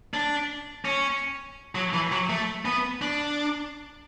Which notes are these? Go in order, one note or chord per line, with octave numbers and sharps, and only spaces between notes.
D4
C#4
F#3
E3
F#3
A3
B3
D4